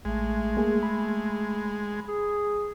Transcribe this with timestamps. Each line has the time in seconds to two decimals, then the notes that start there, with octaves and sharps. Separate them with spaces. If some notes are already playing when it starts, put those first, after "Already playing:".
0.05 A1 G#3 A3
0.57 A#3 G#4
0.83 B5
2.08 G#4